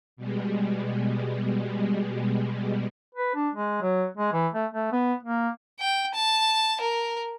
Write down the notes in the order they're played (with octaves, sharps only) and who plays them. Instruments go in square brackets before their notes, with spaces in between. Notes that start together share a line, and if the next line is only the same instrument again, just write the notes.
[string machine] B2 G3 G#3
[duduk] B4
D4
G#3
F#3
G#3
E3
A3
A3
B3
A#3
[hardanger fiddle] G5
A5
A#4